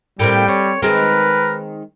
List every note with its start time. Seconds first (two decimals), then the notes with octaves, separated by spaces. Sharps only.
0.19 A2 G3 A#3 C4 G5
0.48 C4 C#5
0.82 D#3 G#3 C4 A#4 B4